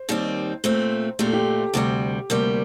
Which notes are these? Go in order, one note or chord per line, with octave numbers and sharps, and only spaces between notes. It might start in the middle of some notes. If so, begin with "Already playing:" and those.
Already playing: C5
D#2 D#3 G3 C4
A#2 A3 C4 C5
A#2 A3 C4 G4
A4
G4
D2 C3 G3
D2 C3 G3 A#3